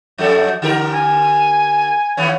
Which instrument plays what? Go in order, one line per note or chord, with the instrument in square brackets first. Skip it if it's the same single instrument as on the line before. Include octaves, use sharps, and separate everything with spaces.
[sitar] F2 F#3 A4
D3 G4 A#4
[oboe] G#5
[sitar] D#2 B3 C#4